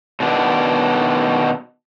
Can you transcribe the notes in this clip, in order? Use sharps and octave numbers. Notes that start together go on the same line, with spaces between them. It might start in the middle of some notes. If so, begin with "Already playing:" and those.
B2 D#3 B3 D4